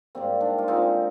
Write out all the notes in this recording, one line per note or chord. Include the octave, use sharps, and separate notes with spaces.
G#2 G3 A#3 C4
D4
F4
D3 G#3 C4 D#4